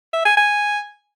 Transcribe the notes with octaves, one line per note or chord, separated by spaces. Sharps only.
E5
G#5
G#5